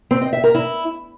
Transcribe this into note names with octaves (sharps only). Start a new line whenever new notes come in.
C4
D#5
E5
A#4
E4